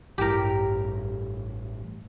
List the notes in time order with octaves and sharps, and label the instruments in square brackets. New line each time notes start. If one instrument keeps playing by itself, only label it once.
[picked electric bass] A1 G3 [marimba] G2 E4 A#6 [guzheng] G4 A#4